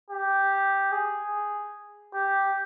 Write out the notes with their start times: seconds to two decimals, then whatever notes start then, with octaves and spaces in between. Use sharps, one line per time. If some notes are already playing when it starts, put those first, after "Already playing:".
0.10 G4
0.92 G#4
2.13 G4